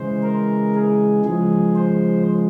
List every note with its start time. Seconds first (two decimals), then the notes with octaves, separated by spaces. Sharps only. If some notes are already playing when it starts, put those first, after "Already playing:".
Already playing: C#3 E3 G#3 C5
0.23 A#4
0.74 G#4
1.25 C#3 F3 G#3 G#4
1.76 C5